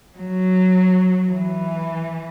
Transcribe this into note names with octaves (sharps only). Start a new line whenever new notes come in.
F#3
E3